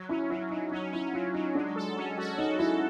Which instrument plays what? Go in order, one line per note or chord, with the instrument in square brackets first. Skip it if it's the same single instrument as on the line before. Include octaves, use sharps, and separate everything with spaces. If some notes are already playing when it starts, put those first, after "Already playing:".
Already playing: [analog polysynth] F#3
[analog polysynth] C#4 [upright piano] E4
[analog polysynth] F#3 [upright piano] E4
[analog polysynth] F#3 [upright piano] D#4
[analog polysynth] C#4 [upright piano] D#4
[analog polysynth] C#4 [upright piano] E4
[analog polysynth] F#3 [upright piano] F4
[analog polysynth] F#3 [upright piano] D#4
[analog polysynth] G#3 [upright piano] D4
[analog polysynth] A4
C#4
F#4
[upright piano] D#4 [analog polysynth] A4
[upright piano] E4 [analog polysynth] A4